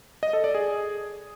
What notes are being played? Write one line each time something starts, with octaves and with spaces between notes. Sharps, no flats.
D#5
A4
D5
G#4